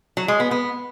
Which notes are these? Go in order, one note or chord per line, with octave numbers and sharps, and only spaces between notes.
F#3
G#3
B3
B3